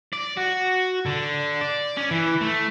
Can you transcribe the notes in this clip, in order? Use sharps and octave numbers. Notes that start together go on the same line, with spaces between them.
D5
F#4
D3
D5
C#4
E3
A3